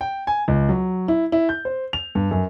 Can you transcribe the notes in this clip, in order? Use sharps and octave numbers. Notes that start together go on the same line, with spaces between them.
G5
G#5
C#2
F#3
E4
E4
G6
C5
F7
G2
F#2